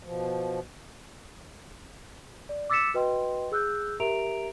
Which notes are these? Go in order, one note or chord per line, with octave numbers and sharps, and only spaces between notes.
B2 F3
D5
D6 E6 A6 B6 C#7 E7
F#4 B4 D#5 G5 C6
G#4 E6 F#6 G6
G4 A#4 E5 A#5 D7 F7